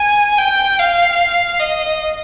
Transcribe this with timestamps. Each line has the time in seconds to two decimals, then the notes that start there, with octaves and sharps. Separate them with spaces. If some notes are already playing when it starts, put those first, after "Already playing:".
Already playing: G#5
0.38 G5
0.78 F5
1.59 D#5